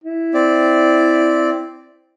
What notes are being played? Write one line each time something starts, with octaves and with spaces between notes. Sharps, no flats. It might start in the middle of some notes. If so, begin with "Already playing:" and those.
E4
C4 D5